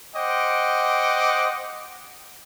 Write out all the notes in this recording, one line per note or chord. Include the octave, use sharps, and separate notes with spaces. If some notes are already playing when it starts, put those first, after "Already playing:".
C5 D#5 F#5 G5 D6